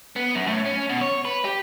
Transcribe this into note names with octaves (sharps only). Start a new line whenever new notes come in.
B3
F#2
A2
C#4
B2
C#5
B4
G4